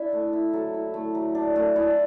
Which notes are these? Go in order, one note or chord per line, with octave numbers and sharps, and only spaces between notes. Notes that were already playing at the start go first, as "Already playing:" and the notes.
Already playing: D4 E4 E5
A3
E4
F#3 A4
E4
A3
F#3
D4
A3
E4 D5